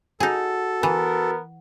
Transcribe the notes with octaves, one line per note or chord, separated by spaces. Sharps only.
D#4 F#4 G#4 A4
E3 B3 A#4